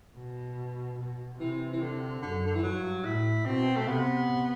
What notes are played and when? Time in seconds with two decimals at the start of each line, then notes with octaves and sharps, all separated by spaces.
0.16 B2
0.99 B2
1.40 C3 E3
1.73 E3
1.82 D3
2.22 F#2 D3
2.46 D3
2.55 E3
2.63 G2 F#3
3.04 A2 E4
3.46 B2 C4
3.76 A3
3.87 C3 B3